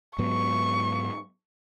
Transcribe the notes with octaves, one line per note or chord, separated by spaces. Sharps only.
G#2 F#3 B3 C#6